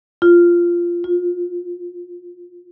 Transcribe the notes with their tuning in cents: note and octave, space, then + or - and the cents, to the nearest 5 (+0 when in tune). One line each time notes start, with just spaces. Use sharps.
F4 -10
F4 +25